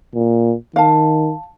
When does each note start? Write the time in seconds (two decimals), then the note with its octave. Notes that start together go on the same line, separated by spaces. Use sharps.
0.15 A#2
0.76 D#3 F5 A5